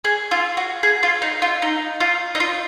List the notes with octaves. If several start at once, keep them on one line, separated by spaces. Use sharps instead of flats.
G#4
F4
F#4
G#4
F4
D#4
F4
D#4
F4
D#4
F4